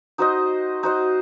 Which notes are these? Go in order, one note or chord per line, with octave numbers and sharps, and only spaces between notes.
D#4 F#4 C5 D#5
D#4 F#4 C5 D#5